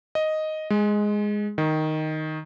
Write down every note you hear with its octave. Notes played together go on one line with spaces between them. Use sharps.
D#5
G#3
D#3